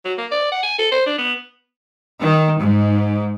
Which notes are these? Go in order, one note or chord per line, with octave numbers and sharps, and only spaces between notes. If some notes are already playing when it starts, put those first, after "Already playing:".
F#3
A#3
D5
F#5
G#5
A4
C5
D4
B3
D#3
G#2